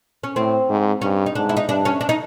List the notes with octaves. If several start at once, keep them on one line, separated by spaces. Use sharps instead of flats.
C#4
A2 C4
G#2
G2 C#4
D#4
G#2 D4
E4
D#4
G2 D4
C#4
D4
D#4